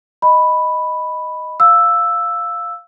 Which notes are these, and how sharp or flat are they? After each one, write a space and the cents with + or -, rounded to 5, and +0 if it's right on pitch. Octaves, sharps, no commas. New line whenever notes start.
D#5 +0 B5 +0
F5 +0 E6 +0